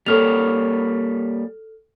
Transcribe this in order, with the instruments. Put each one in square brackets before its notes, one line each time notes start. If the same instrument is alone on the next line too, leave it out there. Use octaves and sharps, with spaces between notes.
[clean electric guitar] G3 A#3 C#5 [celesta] A4 F6 F7